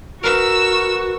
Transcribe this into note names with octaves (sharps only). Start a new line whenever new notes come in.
F#4 A#4 B4 E6